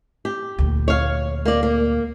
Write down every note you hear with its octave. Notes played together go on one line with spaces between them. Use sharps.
G4
D2 A#2
C#5 F5
A#3 D5
A#3